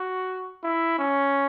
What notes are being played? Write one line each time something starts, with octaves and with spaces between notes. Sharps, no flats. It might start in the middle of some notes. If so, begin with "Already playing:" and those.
Already playing: F#4
E4
C#4